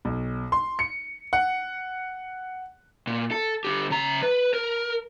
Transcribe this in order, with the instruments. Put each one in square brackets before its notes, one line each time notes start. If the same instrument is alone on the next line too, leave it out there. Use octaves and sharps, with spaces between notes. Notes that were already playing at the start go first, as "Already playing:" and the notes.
[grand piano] B1
C6
C#7
F#5
[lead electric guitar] A#2
A4
D3 G4
C#3 A#5
B4
A#4